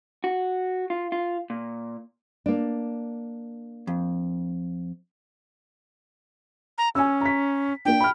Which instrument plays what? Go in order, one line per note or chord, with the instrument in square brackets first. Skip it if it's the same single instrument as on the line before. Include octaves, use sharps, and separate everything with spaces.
[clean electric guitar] F#4
F4
F4
A#2
[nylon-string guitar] A#3 D4
[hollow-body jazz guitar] F2
[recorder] A#5
[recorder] C#4 [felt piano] G#5 E6
[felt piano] A#5 B6
[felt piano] A#3 D4 [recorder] G5
[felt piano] B5 F6